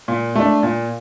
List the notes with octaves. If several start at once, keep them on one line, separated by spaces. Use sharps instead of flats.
A#2
A3 D4
A#2